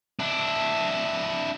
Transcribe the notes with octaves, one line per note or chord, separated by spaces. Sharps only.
D4 E4